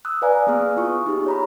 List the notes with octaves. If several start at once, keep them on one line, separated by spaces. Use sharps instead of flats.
D#6 E6 F#6
B4 D5 F5 G#5 A#5
A#3 B3 G#4 D#6 F6
E4 F4 C#6
D#4 E4 G4 G#4
C#5 A#5 B5